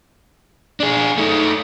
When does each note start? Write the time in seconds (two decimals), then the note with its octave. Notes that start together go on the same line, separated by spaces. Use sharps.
0.80 D4 G#4
1.18 A3 D#4